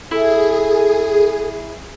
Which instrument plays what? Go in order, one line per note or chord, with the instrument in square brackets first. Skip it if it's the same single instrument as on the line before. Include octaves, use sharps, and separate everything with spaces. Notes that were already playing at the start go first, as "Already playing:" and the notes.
[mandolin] E4 [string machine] G#4 [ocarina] A4